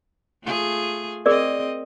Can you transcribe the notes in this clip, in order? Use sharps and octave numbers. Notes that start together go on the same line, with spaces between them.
A3 F4 G#4
C4 G#4 A#4 D5 D#5